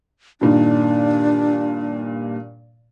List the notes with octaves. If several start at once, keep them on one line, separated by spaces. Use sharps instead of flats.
G2 A#2 D#3 D4